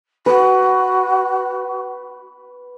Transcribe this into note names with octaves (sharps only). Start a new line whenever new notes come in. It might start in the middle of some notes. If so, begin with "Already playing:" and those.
F#4 B4